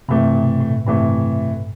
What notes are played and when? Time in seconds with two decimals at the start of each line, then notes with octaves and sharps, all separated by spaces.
0.08 G2 C3 E3 A3
0.35 B2
0.61 A2
0.86 G2 C3 E3 A3